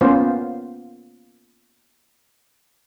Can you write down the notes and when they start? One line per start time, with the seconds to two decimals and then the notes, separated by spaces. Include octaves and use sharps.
0.01 A#3 B3 C#4 F4 C5